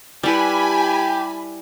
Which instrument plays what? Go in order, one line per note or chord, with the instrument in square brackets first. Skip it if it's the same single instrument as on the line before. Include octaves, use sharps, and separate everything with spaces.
[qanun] G3 E4 B4 [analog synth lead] G4 [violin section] G#5 A5 B5